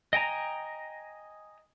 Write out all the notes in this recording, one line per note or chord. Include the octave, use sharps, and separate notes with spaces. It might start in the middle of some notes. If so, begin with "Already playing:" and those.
D#5 G5 G#5 A#5